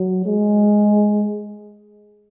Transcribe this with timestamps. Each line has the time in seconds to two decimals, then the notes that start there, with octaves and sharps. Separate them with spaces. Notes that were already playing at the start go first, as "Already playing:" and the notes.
Already playing: F#3
0.26 G#3